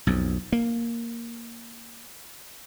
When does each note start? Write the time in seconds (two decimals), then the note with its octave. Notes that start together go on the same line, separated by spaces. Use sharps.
0.07 B1 F2
0.52 A#3